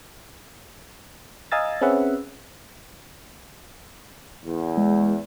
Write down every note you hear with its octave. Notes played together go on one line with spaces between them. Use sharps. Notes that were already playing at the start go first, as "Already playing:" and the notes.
D#5 F5 G#5 A#5 E6 A6
C4 C#4 G#4 B4 E5 F#5
E2
G#3